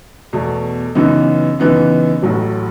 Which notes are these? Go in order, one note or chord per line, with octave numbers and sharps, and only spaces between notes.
E2 B2 A3
F#2 C#3 E3 B3 D#4
F#2 C#3 E3 B3 D#4
A1 A2 F#3